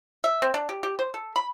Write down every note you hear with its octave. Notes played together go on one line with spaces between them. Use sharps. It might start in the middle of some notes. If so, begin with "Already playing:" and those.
E5
C4
D4
G4
G4
C5
A4
B5